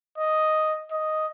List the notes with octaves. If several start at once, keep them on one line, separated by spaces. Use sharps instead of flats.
D#5
D#5